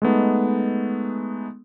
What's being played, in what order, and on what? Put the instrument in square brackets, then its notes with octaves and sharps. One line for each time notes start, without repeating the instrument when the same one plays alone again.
[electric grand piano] G#3 A3 B3 D#4